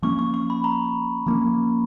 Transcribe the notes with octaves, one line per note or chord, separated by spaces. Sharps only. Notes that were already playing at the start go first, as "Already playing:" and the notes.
F3 A#3 C#4 C#6
C#6
C#6
B5
A#5
F3 A#3 C#4